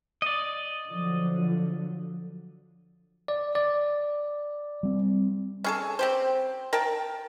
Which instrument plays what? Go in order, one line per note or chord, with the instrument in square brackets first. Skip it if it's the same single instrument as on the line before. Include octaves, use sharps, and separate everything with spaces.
[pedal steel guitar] D5 D#5
[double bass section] D3 F3 F#3
[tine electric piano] D5
D5
[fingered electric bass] G3 C4
[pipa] C#4 G#4 A4
C4 G4 C5
A#4 G5 A5